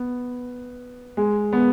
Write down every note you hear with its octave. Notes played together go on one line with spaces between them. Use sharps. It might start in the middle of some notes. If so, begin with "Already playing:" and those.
Already playing: B3
G#3
B3